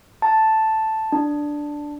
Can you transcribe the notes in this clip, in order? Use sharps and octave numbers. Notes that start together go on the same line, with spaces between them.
A5
D4